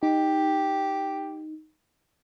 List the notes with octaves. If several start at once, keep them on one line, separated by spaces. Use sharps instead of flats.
D#4 G4